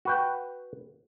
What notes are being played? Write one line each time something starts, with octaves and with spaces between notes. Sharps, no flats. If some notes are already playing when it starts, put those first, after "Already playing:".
F#4 B4 G5